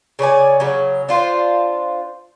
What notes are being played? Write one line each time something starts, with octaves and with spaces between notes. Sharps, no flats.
C#3 C#5 D5 G#5
C#3 F#3
D4 F4 C5